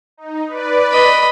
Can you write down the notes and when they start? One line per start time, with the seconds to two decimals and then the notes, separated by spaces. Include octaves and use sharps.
0.17 D#4
0.47 B4 D5
0.91 D#5 B5